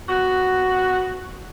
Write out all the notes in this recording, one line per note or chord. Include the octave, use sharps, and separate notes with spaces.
B3 F#4